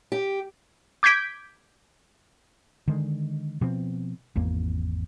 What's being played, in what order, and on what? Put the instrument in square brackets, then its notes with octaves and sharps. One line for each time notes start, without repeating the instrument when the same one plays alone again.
[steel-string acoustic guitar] G4
[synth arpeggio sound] D6 G6 G#6 B6 D7
[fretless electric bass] D3 D#3 G#3
B2 F3 C4
G#1 E2 A#3